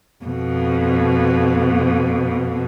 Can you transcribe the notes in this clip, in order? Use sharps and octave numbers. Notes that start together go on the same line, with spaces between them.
F2 B2